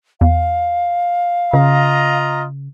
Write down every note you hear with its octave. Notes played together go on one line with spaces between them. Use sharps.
E2 F5
C#3 F4 D#5 A#5